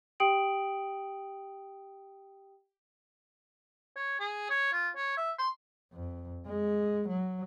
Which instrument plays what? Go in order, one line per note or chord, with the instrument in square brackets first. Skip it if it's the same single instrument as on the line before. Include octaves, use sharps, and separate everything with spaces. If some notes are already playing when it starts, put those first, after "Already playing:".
[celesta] G4 G5 D#6 D7 F#7
[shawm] C#5
G#4
C#5
F4
C#5
E5
C6
[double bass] F2
G#3
F#3